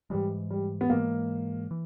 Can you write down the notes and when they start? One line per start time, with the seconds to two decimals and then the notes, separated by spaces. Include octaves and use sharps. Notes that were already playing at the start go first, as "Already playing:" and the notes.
0.10 G#2 E3 G3 G#3
0.50 G3
0.81 B3
0.90 G#2 E3 G#3 A#3
1.71 E3